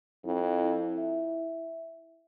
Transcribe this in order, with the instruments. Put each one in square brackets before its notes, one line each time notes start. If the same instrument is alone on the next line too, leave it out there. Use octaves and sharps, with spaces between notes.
[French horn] F2 [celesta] E4
[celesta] E4
E5